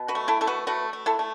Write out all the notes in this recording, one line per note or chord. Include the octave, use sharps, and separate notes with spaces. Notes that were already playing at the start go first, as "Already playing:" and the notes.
Already playing: B2
F#4 B4
A3
E4 A4
A3 A4
F#4 B4
A3 F#4 B4
A3
E4 A4
A3